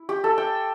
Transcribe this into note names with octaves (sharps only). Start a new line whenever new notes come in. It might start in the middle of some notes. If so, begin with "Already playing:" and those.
Already playing: E4
G4
A4
G5